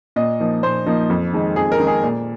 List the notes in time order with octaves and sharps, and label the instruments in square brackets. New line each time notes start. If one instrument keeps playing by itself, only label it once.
[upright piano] A#2 D#5
F3 A#3 D#4
A#2 C5
F3 A#3 D#4
F2
D#3 G#3 D#4
F2 G#4
A#4
D#3 G#3 D#4
G#4
A#2